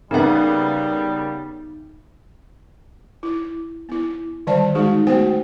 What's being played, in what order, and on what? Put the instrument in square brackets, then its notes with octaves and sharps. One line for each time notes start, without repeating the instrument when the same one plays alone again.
[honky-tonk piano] C#3 A#3 B3 [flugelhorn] G3 [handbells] D#4 E5
[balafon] E4
B3 E4
D3 D#3 G3 C5 D5 A5
G#3 D#4 F#4 G#4
A3 B3 F#4 C5 G5